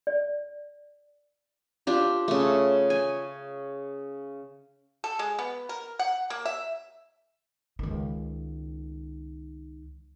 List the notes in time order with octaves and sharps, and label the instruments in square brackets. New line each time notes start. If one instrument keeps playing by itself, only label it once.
[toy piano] D5
[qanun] D4 F4 G4
C#3 A3
G#5
[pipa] A4
G#3
B3
A#4
F#5
A#3
E5
[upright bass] C#2 D#3